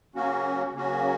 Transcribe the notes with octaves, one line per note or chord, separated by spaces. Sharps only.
C#3 F#3 A#3 C#4 F#4
C#3 F#3 A#3 C#4 F#4